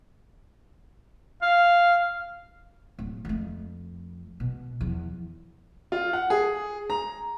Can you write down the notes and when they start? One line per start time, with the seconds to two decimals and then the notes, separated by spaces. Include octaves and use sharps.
1.42 F5
2.99 D1
3.25 F2 A3
4.40 B2
4.80 E2 F3
5.92 F4
6.13 F#5
6.30 G#4
6.90 A#5